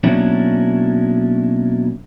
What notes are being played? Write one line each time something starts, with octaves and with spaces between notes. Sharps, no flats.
B2 F#3 A#3 C#4 D4 E4